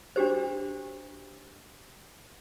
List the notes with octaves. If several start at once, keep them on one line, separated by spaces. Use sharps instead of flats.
D4 F#4 G4 C5